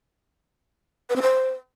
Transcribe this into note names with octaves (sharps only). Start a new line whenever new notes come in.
B4
C4
C5